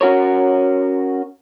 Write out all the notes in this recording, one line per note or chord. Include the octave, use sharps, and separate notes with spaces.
C#4 F#4 A#4 C#5